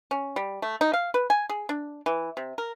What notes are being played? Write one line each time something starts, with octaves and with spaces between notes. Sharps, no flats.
C#4
G3
A3
D#4
F5
B4
G#5
G#4
D4
E3
C3
A#4